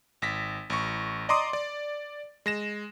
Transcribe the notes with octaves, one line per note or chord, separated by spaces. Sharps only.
G#1 A#6 B6
A1 C#6
D5 D#5 A#5 C6 D6 D#6
D5
G#3 A#6 E7